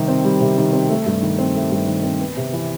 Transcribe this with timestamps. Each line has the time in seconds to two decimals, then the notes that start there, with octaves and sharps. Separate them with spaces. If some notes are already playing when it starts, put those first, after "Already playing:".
Already playing: C3 D#3 G3
0.08 C4
0.25 G3
0.41 C3
0.58 D#3
0.73 C4
0.90 A3
1.06 G2
1.23 D#3
1.38 C4
1.55 A3
1.71 G2
1.87 D#3
2.03 C4
2.20 B3
2.37 C3
2.53 E3